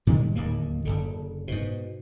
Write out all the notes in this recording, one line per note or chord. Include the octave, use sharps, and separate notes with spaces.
A2 D#3 G3 G#3
D1 D#2 D#3 A#3
F#1 B1 D3
G#2 B2